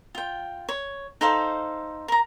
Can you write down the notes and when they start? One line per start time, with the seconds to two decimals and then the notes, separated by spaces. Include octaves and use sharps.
0.15 F4 G5
0.69 C#5
1.21 D#4 A4 C5 F5
2.08 A#4 A#5